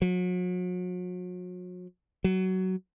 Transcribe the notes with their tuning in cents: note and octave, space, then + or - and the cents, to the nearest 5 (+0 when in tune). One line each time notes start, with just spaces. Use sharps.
F#3 -40
F#3 +15